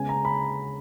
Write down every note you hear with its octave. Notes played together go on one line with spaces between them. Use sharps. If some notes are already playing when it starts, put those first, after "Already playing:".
Already playing: C#3 G#3 B3 G#5
A#5
B5